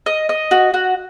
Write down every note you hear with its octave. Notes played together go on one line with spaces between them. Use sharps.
D#5
D#5
F#4
F#4